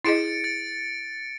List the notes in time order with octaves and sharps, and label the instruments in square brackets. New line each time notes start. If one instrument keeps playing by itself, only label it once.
[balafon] E4 G#4 D#5 [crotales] A6 C#7 D7
[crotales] A6